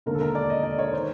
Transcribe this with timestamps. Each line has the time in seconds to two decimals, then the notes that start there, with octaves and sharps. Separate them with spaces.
0.06 E1 D#2 D3 A#4
0.14 A4
0.21 A#4
0.35 D5
0.50 D#5
0.64 D5
0.79 C#5
0.93 D#3 C5